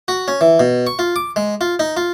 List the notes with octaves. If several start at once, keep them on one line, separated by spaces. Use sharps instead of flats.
F#4
C#4
E3
B2
C#6
F4
D6
G#3
F4
D#4
F4